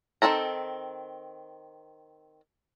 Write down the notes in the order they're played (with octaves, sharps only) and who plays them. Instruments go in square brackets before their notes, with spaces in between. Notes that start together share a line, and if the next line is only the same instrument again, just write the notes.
[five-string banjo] D#3 E3 C4 A4 A#5